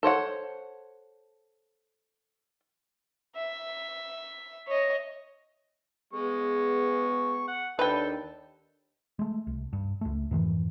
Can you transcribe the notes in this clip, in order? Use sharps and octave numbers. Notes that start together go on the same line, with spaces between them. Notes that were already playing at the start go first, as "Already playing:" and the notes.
A4 C5 C#5 F#5
E5
C#5 D#5
G#3 B3 G#4 C#6
F#5
D#2 D4 A4 B4 G5
G#3 A3
C2
G2
C#2 A3
F2 G#2 D#3 E3